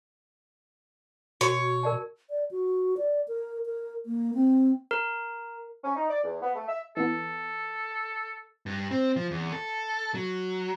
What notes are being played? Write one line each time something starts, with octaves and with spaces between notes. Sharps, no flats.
B2 F#4 C#5
A#4 D5 A5
D5
F#4
D5
A#4
A#4
A#3
C4
A#4
C#4
D#4
D5
E2
B3
A3
E5
E3 B3 A4
G2
C4
F3
E2
A4
F#3